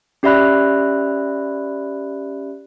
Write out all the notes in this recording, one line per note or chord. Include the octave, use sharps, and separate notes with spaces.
C#4 G4 D5 E5 B5 F#6